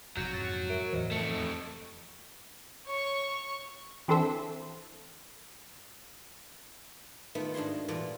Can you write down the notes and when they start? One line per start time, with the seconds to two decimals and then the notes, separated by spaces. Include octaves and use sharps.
0.17 F1 F2 B2 F#3 G6
0.34 F2 G#2 A6
0.70 A#4 E5 D7
0.93 E2 A2 E3 C5 D#5
1.11 F2 A3 C#7
2.86 C#5 C#6
4.08 E3 C4 D4 A4 C5 E5
7.35 D#3 A3 B3 F4 B5
7.54 G#2 D4 F#4 G#4 C6
7.88 E2 G2 A#2 F4 A4 D5